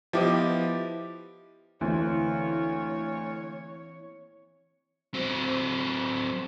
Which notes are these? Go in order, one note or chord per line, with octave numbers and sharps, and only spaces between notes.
F3 B3 E4 G4 D#5 D6
D2 E3 A#3 C4 E4 C#5
F#3 C4